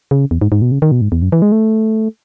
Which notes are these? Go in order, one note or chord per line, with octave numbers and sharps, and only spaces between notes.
C#3
E2
G#2
G#2
B2
C#3
D#3
B2
G#2
E2
F#2
E3
G#3
A3